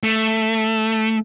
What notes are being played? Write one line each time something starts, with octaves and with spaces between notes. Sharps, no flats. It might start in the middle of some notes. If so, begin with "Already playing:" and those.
A3